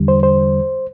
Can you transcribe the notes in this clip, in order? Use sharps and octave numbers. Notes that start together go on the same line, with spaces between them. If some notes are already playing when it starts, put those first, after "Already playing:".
Already playing: E2 D3 G3
C5
C5